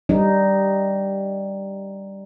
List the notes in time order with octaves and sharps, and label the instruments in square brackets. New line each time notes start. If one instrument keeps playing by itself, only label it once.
[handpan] G3 D#4